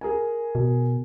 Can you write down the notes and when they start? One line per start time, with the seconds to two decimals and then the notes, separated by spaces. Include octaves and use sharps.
0.01 G#4 A#4 G#5
0.55 B2